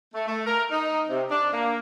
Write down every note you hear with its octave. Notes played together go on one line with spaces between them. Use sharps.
A3
A3
A#4
D#4
C3
D4
A#3